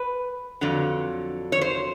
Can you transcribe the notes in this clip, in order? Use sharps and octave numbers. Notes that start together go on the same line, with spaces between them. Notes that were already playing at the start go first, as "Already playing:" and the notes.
Already playing: B4
F2 D3 F#3
C#5
C5